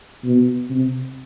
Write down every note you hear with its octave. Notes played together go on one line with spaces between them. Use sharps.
B2
C3